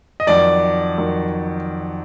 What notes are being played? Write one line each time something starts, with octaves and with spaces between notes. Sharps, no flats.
D#5
F2 D#3 F#3 D5
F2 D#3 F#3